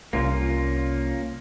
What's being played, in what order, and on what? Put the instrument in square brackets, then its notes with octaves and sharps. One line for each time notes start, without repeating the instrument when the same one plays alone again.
[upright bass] C2 [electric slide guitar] A#3 C#4 F4